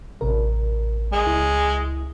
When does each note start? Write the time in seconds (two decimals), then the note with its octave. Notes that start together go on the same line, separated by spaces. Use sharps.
0.21 A1 C3 A#4
1.13 G#3
1.26 C#2 E4